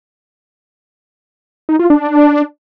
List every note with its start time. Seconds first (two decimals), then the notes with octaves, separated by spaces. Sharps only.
1.69 D#4
1.79 F4
1.90 D4